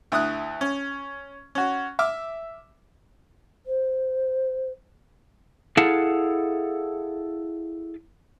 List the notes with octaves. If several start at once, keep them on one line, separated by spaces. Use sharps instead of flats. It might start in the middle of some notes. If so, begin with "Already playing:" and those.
D2 E4 D#6 F#6
C#4
C#4 F#4
E5 D6 F6
C5
E4 G#4 A4 F5 F#5 A5